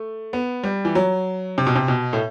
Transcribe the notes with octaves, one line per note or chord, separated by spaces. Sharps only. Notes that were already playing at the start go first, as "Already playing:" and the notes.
Already playing: A3
B3
G3
E3
F#3
C3
B2
C3
B2
A2